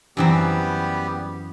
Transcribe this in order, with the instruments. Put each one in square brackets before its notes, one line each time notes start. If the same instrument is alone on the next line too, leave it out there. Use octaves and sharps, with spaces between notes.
[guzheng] F#2 E3 C4 [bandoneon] G3 B3 G4